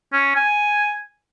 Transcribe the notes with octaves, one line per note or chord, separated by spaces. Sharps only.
C#4
G#5